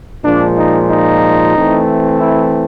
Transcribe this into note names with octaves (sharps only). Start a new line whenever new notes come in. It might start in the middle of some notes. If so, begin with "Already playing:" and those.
A#2 F3 G#3 D4
D#4
D#4
E3 A3 C4
E4